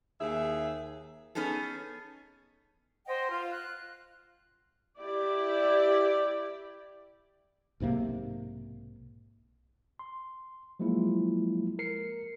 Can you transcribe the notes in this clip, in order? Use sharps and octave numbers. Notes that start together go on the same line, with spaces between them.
D#2 G#4 E5
B3 C#4 D#4 G#4 A4
C5 D#5 F#5 G5
F4 F5
F#6
E4 G4 D5
B1 G#2 C3 A#3
C6
F3 F#3 G#3 A#3 E4 F4
A#4 C7 C#7